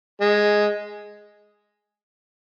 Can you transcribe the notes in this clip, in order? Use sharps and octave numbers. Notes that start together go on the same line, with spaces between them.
G#3